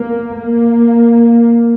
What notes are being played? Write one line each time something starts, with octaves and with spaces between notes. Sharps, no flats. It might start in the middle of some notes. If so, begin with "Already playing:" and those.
Already playing: A#3
A#3